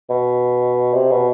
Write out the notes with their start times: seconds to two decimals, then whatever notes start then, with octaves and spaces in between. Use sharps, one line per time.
0.10 B2
0.94 C3
1.11 B2